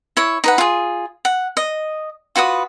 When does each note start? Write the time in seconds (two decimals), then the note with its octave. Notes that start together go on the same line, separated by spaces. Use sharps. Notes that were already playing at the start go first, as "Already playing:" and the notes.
0.17 E4 C#5
0.44 D#4 B4 F#5
0.58 F4 G#4
1.25 F#5
1.57 D#5
2.36 F4 F#4 B4 D#6